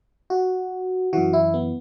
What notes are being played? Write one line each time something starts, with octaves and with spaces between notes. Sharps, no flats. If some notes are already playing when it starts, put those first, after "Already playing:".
F#4
F#2 E3 F#4
E4
B3